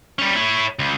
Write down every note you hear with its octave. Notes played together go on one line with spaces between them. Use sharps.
G3 C#4
E4 C#5
C#2